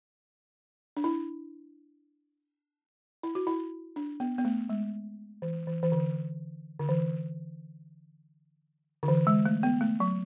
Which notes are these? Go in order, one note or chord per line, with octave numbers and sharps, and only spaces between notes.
D4
E4
E4
F#4
E4
D4
B3
B3
A3
G#3
E3
E3
E3
D3
D3
E3
D3
E3
G#3
A3
B3
A3
F#3